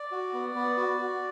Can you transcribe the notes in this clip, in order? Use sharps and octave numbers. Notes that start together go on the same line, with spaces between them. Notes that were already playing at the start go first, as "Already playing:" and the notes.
Already playing: D5
F#4
B3
B3
F#4
F#4